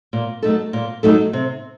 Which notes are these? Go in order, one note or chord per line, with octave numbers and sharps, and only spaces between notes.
A#2
F#3 A3 D#4 A4
A#2
F#3 A3 D#4 A4
C3